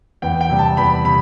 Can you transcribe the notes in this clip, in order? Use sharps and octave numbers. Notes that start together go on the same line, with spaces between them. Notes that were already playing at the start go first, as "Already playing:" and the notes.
E2 G5
G5
C3 G3
A5
E2 B5
C3 B5